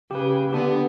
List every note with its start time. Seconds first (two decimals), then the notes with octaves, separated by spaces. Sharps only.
0.11 C#3 G4 B4
0.52 D3 B3 D4 G4